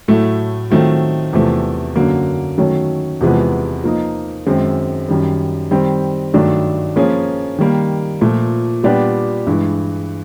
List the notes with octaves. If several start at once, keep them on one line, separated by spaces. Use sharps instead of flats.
A2 F#3 A3
D#3 F#3 A3 C4 F4
E2 C3 F3 A3
F#2 D3 F#3 A#3
D#3 F#3 A3 C#4
E2 C3 F3 G#3 B3
F3 A#3 D#4
F#2 D#3 G#3 C4
F#2 D#3 G3
D#3 G3 C4
G2 D#3 F#3 A3 D4
F3 A#3 C#4 F4 G#4
D#3 G3 A#3
A#2 F3 A3
A#2 G3 B3 D4 G4
G2 E3 G#3